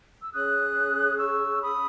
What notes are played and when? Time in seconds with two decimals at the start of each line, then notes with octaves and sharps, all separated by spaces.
0.22 E6
0.33 C#4 G#4 C#5 D#6 F#6
1.18 C#6 E6
1.61 B5 D#6